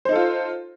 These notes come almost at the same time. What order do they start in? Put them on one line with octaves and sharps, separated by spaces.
C5 D#4 A4 F4